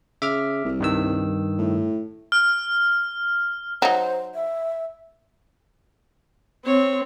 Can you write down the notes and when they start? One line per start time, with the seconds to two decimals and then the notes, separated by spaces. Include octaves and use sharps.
0.22 C#3 E5 D6 F6
0.65 C2
0.80 G2 D#3 E6
1.58 A2
2.32 F6
3.82 F#3 D#4 C5
4.35 E5
6.66 C4 C#5